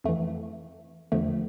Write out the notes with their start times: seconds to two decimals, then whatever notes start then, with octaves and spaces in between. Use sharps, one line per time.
0.04 F2 E3 A3
1.12 E2 D3 F3 A3